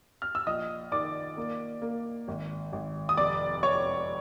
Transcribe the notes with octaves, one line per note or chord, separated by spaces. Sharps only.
F6
E6
A#1 D#5 D#6
D#3 D5 D6
A#3
A#3
G#1
G#1
D#6
F1 D5 D6
F1 C#5 C#6